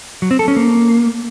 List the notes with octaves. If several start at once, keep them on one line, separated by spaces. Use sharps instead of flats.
F#3
C4
A4
C#4
A#3